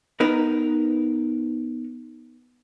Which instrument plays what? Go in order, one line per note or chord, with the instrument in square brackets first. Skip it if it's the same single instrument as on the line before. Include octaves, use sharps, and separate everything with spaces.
[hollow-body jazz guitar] B3 D#4 A#4 B4